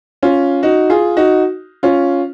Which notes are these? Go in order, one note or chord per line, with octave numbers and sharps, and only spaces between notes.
C#4 F4
D#4 F#4
F4 G#4
D#4 F#4
C#4 F4